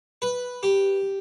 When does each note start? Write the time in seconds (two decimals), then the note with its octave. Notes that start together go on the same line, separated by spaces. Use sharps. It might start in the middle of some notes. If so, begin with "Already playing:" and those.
0.22 B4
0.63 G4